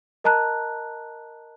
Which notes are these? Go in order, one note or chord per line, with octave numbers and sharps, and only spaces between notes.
A#4 D#5 A5 A#5 F#6